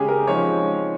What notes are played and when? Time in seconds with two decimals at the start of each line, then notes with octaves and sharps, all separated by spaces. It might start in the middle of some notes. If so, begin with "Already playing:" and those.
Already playing: C#3 G#3 C#4 G4 G#4
0.08 A#4
0.27 F3 G#3 C4 D#4 C#5